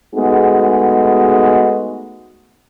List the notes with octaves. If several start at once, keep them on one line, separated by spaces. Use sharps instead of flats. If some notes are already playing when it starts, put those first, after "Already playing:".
G#3 A3 B3 D#4 F#4 G#4